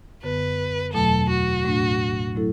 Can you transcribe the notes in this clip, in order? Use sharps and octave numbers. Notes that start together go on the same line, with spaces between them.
F#2 D3 B3 B4
E2 B2 F#3 A3 A4
F#4
A2 A3 D4
F#3 A3 E4 A4